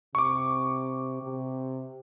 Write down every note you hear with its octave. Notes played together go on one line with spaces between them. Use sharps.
C3 C#6 D6
C3